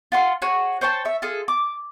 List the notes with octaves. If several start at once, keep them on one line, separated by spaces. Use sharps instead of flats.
F4 F#5 C6
F#4 G#4 C#5
C5 C#5 G5 A5
C#5 E5
F4 G#4 A4
D6